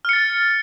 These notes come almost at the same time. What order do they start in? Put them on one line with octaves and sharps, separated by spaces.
F6 C#7 A6